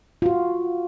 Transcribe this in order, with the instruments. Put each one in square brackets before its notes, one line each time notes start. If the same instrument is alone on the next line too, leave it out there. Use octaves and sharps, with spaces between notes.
[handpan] F4 F#4